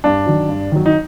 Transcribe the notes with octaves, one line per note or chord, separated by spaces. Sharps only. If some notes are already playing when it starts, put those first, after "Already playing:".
G2 D4
D#3 F#3
G2
D#3 F#3
D#4